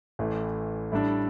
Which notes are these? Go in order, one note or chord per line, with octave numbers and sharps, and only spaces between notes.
A1 A2 E3 A3
A2 G3 D4 A4